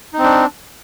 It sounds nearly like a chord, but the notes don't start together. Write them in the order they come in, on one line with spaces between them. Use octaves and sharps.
D#4 C4 D4